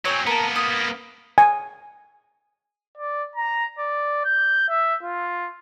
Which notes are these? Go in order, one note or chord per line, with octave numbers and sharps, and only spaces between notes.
F#3 C4 C#5 G#5
A#3 B3 A#4 A5
D#6
G#5
D5
A#5
D5
G6
E5
F4